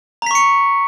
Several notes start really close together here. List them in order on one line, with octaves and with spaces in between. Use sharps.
A#5 B6 C#6 C#7